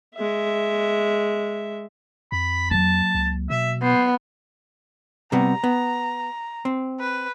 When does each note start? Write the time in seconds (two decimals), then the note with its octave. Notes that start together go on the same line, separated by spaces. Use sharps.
0.15 G#3 E5
2.32 F2 B5
2.71 F#3 A#3 A5
3.15 C#2
3.50 B2 E5
3.82 B3 C5
5.32 C3 G3 B3 A#5
5.64 B3
6.65 C4
7.00 B4